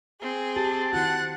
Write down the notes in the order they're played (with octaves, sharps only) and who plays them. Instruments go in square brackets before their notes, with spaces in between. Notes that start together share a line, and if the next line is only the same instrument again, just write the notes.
[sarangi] C4 [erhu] G#4
[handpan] G4 [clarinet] A5
[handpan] D#3 E4 F#4 [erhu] F#5